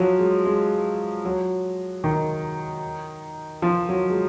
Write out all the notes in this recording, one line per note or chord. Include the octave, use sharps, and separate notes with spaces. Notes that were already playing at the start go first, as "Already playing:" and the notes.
Already playing: F3 F#3
G#3
G#3
F#3
D#3
F3
F#3
G#3